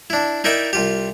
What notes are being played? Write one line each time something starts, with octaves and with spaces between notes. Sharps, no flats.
D4 E4
D#4 E4 A#4 D5 E5 G5
C2 F4 G4